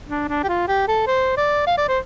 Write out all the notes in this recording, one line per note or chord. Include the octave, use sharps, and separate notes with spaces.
D4
D4
G4
F4
G4
A4
C5
D5
F5
D5
C5